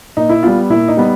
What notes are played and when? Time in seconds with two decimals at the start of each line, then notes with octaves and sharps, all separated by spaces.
0.17 A#2 D#4
0.29 E4
0.43 G3 B3 F4
0.70 A#2 E4
0.88 D#4
0.97 G3 B3